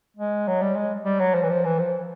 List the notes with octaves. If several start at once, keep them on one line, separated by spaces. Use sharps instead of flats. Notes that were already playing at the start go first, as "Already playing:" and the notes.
G#3
F#3
G3
G#3
G3
F#3
F3
E3
F3
E3
F3